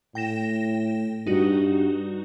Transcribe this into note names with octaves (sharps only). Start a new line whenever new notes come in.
A2 G5 A#6 E7
G2 D#4 F#4